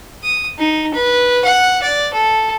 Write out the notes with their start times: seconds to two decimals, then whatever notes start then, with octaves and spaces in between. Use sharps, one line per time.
0.23 D#6
0.59 D#4
0.94 B4
1.44 F#5
1.83 D5
2.13 A4